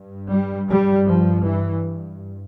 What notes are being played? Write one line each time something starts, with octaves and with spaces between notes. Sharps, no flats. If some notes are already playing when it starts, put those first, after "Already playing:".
Already playing: G2
G3
G3
F3
E3